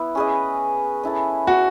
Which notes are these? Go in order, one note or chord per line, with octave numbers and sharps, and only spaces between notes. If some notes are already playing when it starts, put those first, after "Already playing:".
Already playing: B3 E4
C#4 G#4 B4 D#5
C#4 E4 A4
F#4